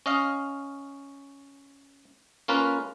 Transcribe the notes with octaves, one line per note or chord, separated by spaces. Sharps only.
C#4 D#5 F5
A#3 C#4 F4 A#4 B4